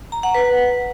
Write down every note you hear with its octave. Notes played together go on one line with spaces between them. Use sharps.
A#5
F#5
B4